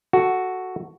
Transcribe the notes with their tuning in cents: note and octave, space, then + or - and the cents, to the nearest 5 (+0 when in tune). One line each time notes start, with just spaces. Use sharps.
F#4 +0 A4 +0